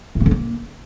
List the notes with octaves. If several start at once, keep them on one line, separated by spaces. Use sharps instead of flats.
A2
A#3
D3
A#3